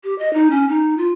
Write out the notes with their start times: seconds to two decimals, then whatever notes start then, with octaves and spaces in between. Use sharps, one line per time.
0.04 G4
0.19 D#5
0.34 D#4
0.51 C#4
0.69 D#4
0.98 F4